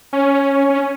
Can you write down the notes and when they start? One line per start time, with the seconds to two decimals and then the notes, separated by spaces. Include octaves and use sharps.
0.13 C#4
0.70 C#4